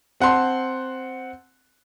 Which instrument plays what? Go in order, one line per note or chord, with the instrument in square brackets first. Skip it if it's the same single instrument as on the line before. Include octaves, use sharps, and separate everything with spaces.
[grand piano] C4 F#5 A5 C6